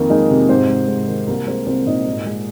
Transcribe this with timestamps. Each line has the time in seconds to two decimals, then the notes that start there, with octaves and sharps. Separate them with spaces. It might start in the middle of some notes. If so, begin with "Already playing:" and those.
Already playing: F2 D#3 A#3 A#4
0.10 G#3 D#4 D#5
0.30 C3
0.49 G#2 C4 C5
0.69 G#3
0.88 G#2
1.08 D#3
1.27 C2 A#3 A#4
1.47 G#3 C4 C5
1.66 C2 C4 C5
1.86 A#2 D#4 D#5
2.07 G#2
2.26 G#3